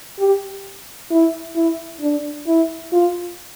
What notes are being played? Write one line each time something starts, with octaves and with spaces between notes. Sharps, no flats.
G4
E4
E4
D4
E4
F4